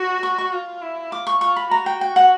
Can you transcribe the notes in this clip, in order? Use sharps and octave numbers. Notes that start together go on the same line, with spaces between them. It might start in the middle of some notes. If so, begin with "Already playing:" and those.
Already playing: F#4
C#6
C#6
F4
E4
F4 D6
C#6
F4 C#6
B5
F#4 A#5
G5
G5
F#5